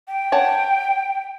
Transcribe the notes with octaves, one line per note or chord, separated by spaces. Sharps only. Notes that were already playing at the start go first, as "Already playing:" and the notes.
G5
C#5 F#5 A5